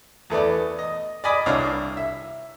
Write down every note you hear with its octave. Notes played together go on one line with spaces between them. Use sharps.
E2 A3 B3 D5
D#5
D5 D#5 G#5 B5 D6 D#6
C2 D4 C#5 F5 D6 F6
E5